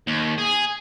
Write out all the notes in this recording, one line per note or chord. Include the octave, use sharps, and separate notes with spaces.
D#2
G#4